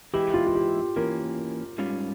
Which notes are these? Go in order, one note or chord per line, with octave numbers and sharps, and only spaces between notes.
E3 G#3 E4 G4
F4
F4
G4
E3 A#3 C#4 A#4
G#2 G3 C#4 F4